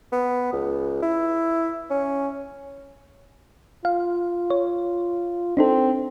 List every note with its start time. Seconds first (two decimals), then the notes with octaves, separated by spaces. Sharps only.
0.12 B3
0.52 C#2
1.02 E4
1.90 C#4
3.85 F4 F5
4.50 C#5
5.57 C4 D4 D#4 A4